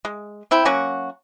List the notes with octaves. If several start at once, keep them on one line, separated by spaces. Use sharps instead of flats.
G#3
C4 E4 G5
F#3 A#3 C#4 F#4